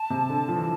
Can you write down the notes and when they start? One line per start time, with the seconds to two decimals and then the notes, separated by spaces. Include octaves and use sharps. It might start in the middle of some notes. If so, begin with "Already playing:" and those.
Already playing: A5
0.10 C3
0.29 D3
0.48 F3
0.55 E3